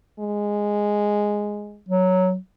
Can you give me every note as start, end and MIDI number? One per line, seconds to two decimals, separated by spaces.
0.20 1.81 56
1.89 2.36 54